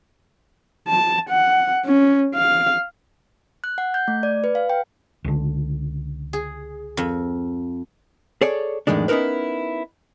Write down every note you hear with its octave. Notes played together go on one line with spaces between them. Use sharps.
A5
F#5
C#4
F5
F#6
F#5
G6
A3
D5
B4
F5
G5
C#2 D3
G#4
F2
G#4 A4 C#5 D5
F2 A2 D#3 E3 G#3 D4
B3 C#4 D#4 E4 A#4 B4